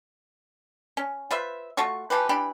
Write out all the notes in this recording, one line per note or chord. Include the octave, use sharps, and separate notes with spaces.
C#4
F4 B4 C5 E5
A3 F4 F#4 C#6
E3 F3 G4 B4
E3 D4 G4 B5